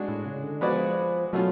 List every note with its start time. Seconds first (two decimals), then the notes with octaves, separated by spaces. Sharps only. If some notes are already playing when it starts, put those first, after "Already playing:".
Already playing: G#3 D4 F#4
0.08 A2
0.26 C#3
0.43 D3
0.61 F3 G#3 B3 F#4 B4 D5
1.33 B2 F#3 A3 C#4 F4